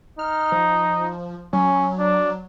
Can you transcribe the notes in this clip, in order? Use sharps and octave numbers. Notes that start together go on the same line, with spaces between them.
D#4 F6
F3
F#3 C#4
D4